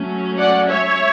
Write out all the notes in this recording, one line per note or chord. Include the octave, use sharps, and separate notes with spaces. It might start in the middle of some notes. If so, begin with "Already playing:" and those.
Already playing: F#3 A3 C#4
D5 F#5
C#5 E5